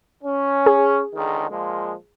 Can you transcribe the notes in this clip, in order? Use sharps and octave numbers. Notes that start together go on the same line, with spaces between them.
C#4
G#4
C#2 D3 D#3
A#2 F3 G#3